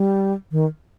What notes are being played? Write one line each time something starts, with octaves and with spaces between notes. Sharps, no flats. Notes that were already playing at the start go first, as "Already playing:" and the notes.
Already playing: G3
D#3